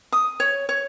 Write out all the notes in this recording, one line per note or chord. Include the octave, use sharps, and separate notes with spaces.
D#6
C#5
C#5